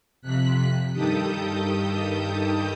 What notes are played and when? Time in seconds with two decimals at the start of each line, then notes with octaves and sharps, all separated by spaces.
0.22 F2 C3 F#6 B6
0.93 G2 D#3 G4 A4 D#6 G6